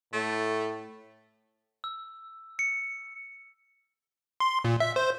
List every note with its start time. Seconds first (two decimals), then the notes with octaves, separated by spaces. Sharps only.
0.13 A2 A3
1.84 E6
2.59 C#7
4.40 C6
4.64 A#2
4.80 E5
4.96 C5